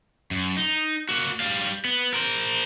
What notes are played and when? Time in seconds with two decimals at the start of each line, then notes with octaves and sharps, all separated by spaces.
0.31 F#2
0.57 D#4
1.09 A#3 F#4
1.40 G3 F5
1.85 B3
2.14 A#4 C5